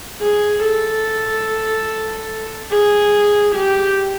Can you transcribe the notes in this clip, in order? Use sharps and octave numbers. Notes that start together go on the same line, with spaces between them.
G#4
A4
G#4
G4